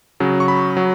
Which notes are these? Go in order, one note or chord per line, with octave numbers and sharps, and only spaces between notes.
C#3 F#3
C#6
B5
F#3